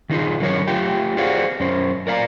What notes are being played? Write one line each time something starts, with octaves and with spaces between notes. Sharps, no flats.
D#3 F#3 D#4 F4 G#4
D3 F#3 A#4 C#5
A3 F4 G4 G5
F#4 G#4 C5 D5 F5 F#5
F#2 C#4 C5
A#4 D5 F5 A#5